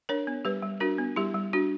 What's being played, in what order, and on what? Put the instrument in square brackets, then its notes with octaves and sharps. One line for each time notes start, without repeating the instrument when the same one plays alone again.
[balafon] D4 A#4 C#5
B3
G3 G4 B4
G3
D4 F#4 A#4
B3
G3 E4 G4
G3
D4 F#4